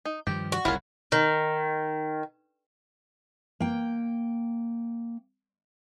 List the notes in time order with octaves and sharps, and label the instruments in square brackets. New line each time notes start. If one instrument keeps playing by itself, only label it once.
[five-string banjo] D#4
[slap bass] G2 D#3 F3 [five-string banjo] G4
[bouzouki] F#4
[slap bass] F#1 C2 [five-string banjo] C#4 F4 A#4 [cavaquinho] E4 F5
[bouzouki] D#3
[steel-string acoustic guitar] A#3 G5